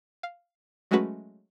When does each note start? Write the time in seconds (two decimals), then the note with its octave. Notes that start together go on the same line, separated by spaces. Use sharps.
0.23 F5
0.91 F#3 G#3 A3 C#4 F#4 B4